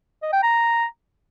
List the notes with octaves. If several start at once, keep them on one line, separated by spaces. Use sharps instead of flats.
D#5
G5
A#5